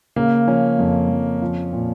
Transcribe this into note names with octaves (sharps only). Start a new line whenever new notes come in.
C#3 A#3
F3 C#4
F2
F2
F3
A#2